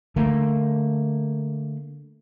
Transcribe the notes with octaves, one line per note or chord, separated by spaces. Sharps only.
D3 A3 A#3